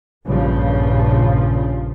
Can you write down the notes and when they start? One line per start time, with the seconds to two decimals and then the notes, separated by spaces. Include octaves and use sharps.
0.24 A#1 G2 C#3 F3